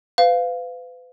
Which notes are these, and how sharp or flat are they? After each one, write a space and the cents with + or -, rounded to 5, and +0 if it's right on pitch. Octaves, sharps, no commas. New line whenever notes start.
B4 +40 F5 +0